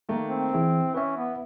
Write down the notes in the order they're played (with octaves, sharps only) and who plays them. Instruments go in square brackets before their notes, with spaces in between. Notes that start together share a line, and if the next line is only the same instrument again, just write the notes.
[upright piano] D#3 A3 A#3
[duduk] C4
[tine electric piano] E3 G#4 [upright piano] E4
[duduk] C#4 [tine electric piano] B4 E5
[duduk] B3